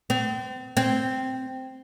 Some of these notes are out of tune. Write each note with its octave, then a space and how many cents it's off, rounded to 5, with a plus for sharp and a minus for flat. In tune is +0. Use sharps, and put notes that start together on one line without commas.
C4 -35
C4 -5